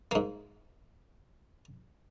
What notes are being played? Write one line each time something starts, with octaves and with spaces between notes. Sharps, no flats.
G#2 A#3